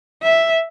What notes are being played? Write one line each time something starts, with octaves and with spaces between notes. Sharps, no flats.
E5